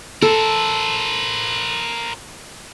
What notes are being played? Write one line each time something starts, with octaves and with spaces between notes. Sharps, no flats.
A4 A#4 C5